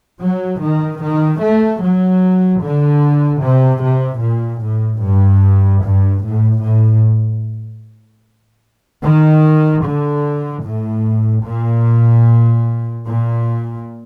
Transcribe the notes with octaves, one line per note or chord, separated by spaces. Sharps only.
F#3
D#3
D#3
A3
F#3
D3
C3
C3
A#2
A2
G2
G2
A2
A2
D#3
D3
A2
A#2
A#2